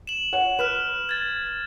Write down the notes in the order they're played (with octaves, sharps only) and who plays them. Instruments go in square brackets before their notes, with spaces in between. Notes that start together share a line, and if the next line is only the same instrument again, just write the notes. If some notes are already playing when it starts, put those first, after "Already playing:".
[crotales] E7 F#7
[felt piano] C#5 F#5
[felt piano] B4 [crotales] F6 F#6 E7
[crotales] G#6 A6